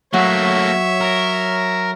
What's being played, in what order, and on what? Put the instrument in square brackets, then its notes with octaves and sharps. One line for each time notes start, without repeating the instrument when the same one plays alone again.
[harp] F#3 [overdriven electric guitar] A3 A#3 [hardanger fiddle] C#5 E5
[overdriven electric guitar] A#4